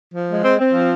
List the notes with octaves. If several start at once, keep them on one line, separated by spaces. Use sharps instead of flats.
F3
G#3
C4
C4
F3